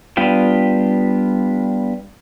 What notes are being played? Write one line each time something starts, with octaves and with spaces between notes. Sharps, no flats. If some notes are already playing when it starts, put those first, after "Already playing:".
G3 B3 D4 F4 G5